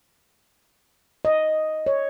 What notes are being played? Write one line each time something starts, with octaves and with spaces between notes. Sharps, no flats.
D#5
C#5